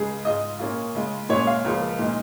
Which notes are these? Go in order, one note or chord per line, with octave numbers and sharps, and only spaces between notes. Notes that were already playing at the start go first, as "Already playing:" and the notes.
Already playing: C#2 C#3 G#3 G#4
G#2 G#3 F4 D#5
A#2 A#3 C#4 F4
C#3 G#3 F4
A#2 G#3 C#4 C#5
F5
C#2 C#3 F3 A#3
A#2 G#3 D#4